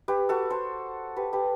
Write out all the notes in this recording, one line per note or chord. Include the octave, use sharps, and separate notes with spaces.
G4 B4
F#4 A4
A4 C5
G4 B4
G4 B4